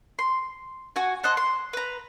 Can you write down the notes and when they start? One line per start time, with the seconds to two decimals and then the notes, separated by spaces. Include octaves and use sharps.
0.19 C6
0.96 F#4 G#5
1.23 C5 D#5 F#5 A5
1.37 C6
1.73 B4 A#5